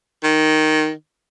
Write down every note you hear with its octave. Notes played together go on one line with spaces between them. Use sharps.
D#3